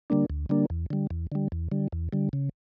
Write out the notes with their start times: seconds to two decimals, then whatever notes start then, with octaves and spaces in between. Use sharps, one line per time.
0.10 D3 G3 A#3 D4
0.30 D2
0.49 D3 G3 A#3 D4
0.70 E2
0.90 D3 G3
1.10 E2
1.32 D3 G3
1.52 E2
1.72 D3 G3
1.92 E2
2.13 D3 G3
2.33 C#3